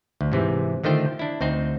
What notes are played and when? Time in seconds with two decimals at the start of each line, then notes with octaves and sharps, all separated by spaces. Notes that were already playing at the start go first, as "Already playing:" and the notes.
0.21 D2
0.32 G#2 C3 E3
0.84 D3 D#3 A3 F4 C5 G5
1.19 D4 E4
1.41 D2 C4 D#4 C5